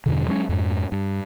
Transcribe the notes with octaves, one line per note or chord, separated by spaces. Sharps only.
E2 G2 B2 D3
F#3 G#3 A3 C#4
F2 G#2
G2